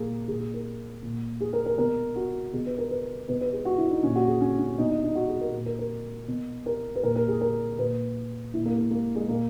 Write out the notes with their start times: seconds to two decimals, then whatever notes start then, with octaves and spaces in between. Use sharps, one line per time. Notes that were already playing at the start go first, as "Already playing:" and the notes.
Already playing: A#2 A#3 G#4
0.28 A#2 G#4
0.40 G#4
0.54 A#4
1.03 A#2
1.41 G#4
1.53 A#4
1.66 A#4
1.78 B2 A#4
2.16 F#4
2.53 B2 G#4
2.66 B4
2.78 A#4
2.90 B4
3.28 B2 B4
3.41 B4
3.53 G#4
3.65 F#4
3.78 E4
3.91 D#4
4.03 A#2 C#4
4.16 F#4
4.28 G#4
4.41 C#4
4.59 C#4
4.78 B2 D#4
4.91 D#4
5.04 D#4
5.15 F#4
5.28 G#4
5.41 A#4
5.53 A#2
5.66 A#4
5.79 A#4
6.28 B2
6.66 A#4
6.95 B4
7.03 A#2 A#4
7.16 A#4
7.28 G#4
7.41 A#4
7.78 A#2 B4
8.54 A#2 E4
8.66 A#3
8.78 A#3
8.91 A#3
9.15 G#3
9.28 A#2 A#3